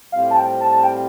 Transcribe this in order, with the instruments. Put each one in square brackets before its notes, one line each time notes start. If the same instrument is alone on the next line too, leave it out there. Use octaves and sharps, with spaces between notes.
[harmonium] A2 G3 C4 F4 [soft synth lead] F5
[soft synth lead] A5
G5
A5
A5
G5